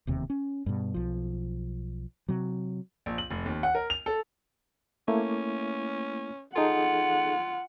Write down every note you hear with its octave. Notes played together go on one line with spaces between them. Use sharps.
E1 D#2 C3
C#4
G2 B2
B1 F3
C3 F#3
A#1
F#7
F1
D#2
F#5
A#4
F7
A4
A3 A#3 C#4 E4
D#4 F4 G#4 A4 F#5